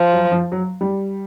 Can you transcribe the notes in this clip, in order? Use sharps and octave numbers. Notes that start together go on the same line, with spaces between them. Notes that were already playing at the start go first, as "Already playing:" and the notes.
Already playing: F3
F#3
F3
F#3
G3